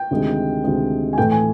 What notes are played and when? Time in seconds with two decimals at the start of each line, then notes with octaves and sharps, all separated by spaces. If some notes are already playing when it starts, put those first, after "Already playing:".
Already playing: G5
0.11 D2 C3 D#3 G#3
0.64 D2 C3 D#3 G#3
1.13 G#5
1.18 A2 E3 A3 G5
1.31 G#5